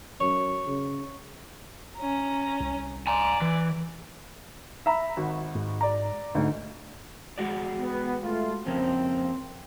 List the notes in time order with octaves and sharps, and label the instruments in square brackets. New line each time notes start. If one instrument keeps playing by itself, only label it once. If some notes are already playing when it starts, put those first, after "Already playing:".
[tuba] F#2 [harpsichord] C#5
[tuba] C#3
[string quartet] C#4 A#5
[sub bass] C2
[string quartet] D5 [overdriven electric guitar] G#5 A#5
[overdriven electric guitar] E3
[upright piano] E5 A#5 B5
G#1 F#4
[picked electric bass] G#2
[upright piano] D5 A#5
[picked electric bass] G#1 G#2 A3 [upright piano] D2 D#4
[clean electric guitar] G#3 F#4 D5
[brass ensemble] B3
A3 F4
[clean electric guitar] F2 C#3 A#3 [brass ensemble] C4